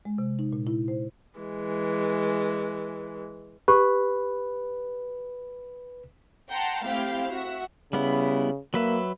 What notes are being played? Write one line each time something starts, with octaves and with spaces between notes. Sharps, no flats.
G#3
C3
D#4
A#2
E4
C5
E3 G#3
G4 B4
F#5 G5 A5 A#5 C6
A3 C4 E4 G4 F5 G5
F#4 E5 F#5
C#3 G3 B3 E4
F#3 A#3 B4 E5